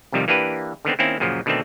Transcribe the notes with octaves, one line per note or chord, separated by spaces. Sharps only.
C2 F2 C3 D#3 G3
E3 A#3 D4 G4 B4
D3 D#3 B3 C4
D#3 A#3 C4 C#4 E4
F#2 A#2 C#3 F3
B2 D3 D#3 A3 C4